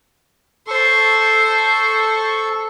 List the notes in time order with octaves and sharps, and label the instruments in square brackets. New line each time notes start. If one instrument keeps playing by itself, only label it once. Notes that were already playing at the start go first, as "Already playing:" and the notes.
[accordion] A4 C#6 [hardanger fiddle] C5